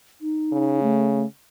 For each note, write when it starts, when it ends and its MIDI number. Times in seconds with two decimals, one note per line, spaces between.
0.21 0.80 63
0.53 1.24 49
0.83 1.26 57